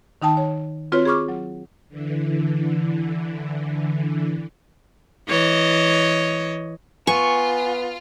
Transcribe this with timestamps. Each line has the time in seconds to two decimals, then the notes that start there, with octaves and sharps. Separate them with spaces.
0.22 D#3 D#4 G5 A5
0.37 C#5
0.92 C4 F4 F#4 B4 C#5
1.05 G#4 B5 C#6 D6 F6
1.28 F#3
1.89 D3 E3
5.27 E3 C#5 D#5
7.07 B3 F4 G#5 C#6